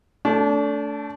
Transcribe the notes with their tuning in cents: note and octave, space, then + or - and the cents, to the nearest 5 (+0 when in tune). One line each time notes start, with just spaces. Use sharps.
A3 +0 D4 -35